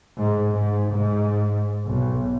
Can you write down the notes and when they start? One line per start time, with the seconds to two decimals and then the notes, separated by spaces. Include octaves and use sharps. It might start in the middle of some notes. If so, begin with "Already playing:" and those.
0.18 G#2
0.54 G#2
0.92 G#2
1.86 B1